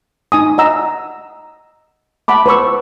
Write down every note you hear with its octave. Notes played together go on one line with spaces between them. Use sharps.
D#4 G#5 D#6
D#5 F#5 A#5 E6
F#5 A5 B5 D6
B4 C5 C#6 E6